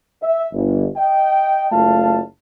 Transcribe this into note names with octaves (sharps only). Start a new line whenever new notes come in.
E5
G1
D#5 G5
F#1 A3 F4 F5 A5